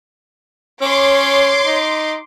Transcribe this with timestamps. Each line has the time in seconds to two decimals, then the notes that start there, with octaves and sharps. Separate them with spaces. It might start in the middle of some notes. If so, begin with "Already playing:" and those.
0.81 C#4 C#5 C6 D6
1.66 D#4